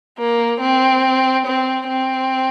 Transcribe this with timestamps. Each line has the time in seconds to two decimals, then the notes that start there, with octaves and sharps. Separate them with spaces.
0.18 A#3
0.61 C4
1.46 C4
1.89 C4